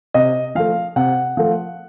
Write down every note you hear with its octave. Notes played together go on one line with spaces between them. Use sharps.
C3 D#5
F3 A3 F5
C3 F#5
F3 A3